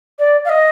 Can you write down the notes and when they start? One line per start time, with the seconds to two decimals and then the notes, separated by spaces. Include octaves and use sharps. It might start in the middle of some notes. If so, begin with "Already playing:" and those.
0.19 D5
0.45 F5
0.49 D#5